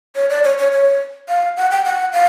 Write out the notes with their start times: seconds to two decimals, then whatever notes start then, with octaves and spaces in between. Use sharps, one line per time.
0.16 C#5
0.30 D5
0.44 C#5
0.58 C#5
0.72 C#5
1.29 F5
1.57 F#5
1.71 G5
1.85 F#5
2.13 F5